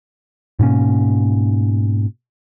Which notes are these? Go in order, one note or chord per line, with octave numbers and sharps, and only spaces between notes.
G#2 B2 A#3 C#4